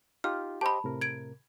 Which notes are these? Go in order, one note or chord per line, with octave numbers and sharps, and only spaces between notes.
D#4 F4 G4 F6
G4 C5 D#5 A5 B5
A2 C3 A#4
G#6 D7